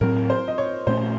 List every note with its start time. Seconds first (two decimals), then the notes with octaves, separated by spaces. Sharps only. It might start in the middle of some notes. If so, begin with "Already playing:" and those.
0.01 A2 F#3 C4 A#4
0.30 C5
0.48 D#5
0.58 C#5
0.87 A#2 A3 C#4 C5